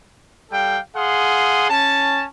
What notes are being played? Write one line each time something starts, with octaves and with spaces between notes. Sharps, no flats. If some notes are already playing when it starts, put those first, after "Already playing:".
G3 A4 F5 G5
G#4 F5 F#5 C6 D#6
C#4 A5